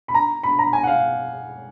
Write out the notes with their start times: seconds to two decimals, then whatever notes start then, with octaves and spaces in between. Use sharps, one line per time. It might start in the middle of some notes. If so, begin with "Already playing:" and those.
0.08 B5
0.14 A#5
0.43 B5
0.59 A#5
0.73 G#5
0.83 F#5
0.87 F5